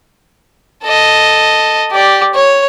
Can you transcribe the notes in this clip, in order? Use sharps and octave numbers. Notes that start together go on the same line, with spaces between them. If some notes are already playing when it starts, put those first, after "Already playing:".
A4 D#5
G4 D5
C#5